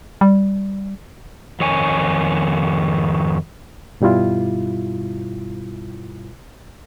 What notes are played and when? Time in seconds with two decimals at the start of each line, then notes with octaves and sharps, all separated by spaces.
0.21 G3
1.60 F2 D#3 C#5 G#5
4.01 G2 B2 G3 E4 F4